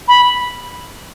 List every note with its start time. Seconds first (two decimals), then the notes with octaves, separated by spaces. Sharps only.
0.08 B5